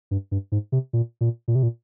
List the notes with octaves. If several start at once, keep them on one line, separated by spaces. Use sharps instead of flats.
G2
G2
G#2
C3
A#2
A#2
A#2
C3
A#2